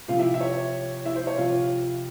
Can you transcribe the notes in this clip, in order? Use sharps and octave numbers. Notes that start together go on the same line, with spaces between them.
C3 F3 F4 F5
E4 E5
E5
C#5
E4 E5
C5
C#5
C3 F3 F4 F5